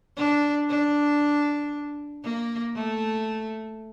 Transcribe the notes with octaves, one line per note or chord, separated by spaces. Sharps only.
D4
D4
A#3
A3